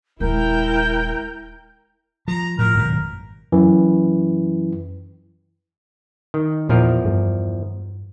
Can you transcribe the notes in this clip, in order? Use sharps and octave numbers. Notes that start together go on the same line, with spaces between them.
D#1 G#3 E4 A#4 G5 G6
F3 A#5
A2 F3 A#4
G#1 F#2 B2
F#2 E3
D#3
E2 A#2 F3 A#4
G2